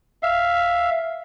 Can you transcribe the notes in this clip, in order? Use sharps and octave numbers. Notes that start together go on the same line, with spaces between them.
E5 F5